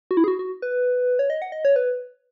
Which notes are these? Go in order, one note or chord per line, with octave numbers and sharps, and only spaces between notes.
F#4
E4
G#4
F#4
F#4
B4
C#5
D#5
F#5
D#5
C#5
B4